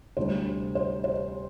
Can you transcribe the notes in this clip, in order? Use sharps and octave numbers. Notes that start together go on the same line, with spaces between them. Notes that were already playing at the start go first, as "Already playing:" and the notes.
D2 C3 G3 C5
C5
C5